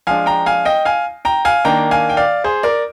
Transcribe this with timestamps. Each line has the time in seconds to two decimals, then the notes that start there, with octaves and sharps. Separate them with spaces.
0.07 F3 G#3 D4 F5 G#5
0.26 G5 A#5
0.46 F5 G#5
0.65 D#5 G5
0.85 F5 G#5
1.25 G5 A#5
1.45 F5 G#5
1.65 D#3 A#3 D4 G5 A#5
1.91 F5 G#5
2.10 G5
2.17 D5 F5
2.44 G#4 C5
2.63 A#4 D5